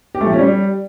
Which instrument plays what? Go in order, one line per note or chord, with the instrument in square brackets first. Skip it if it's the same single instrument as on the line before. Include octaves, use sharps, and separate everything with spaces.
[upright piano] G4
A3
F3
C#4
G3